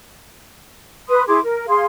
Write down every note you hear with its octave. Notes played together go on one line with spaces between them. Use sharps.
B4 C6 D#6
E4 G#4 C6 D6
A#4
G#4 F5 C6